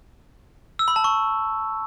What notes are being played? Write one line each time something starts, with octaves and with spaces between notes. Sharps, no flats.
E6
B5
A5
C#6